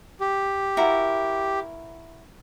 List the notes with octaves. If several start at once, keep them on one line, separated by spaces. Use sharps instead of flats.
G4
E4 F#4 A#4